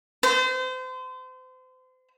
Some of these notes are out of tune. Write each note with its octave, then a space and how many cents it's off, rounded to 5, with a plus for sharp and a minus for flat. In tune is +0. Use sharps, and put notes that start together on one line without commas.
C5 -35